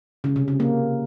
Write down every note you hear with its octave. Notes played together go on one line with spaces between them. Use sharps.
C#3
C3
C#3
A#3